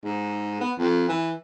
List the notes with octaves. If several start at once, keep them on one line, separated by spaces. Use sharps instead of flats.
G#2
B3
F2
E3